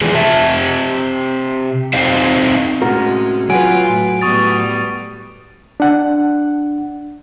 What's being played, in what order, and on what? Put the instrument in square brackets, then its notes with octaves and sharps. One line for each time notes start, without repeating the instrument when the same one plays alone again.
[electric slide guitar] E3 F3 G#3 G#4
C3 E5 A5
C4 D#4 C5 D#5 F5
[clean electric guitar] A2 C3 [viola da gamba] G#3 C#4 [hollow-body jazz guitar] F#4 A#4
[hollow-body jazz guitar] F#3 [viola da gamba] F4 B4 [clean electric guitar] G#5 [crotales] D7
[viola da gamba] A2
[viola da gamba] A2 G3 B3 [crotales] C#6 D#6 A6
[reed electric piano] D4 F#5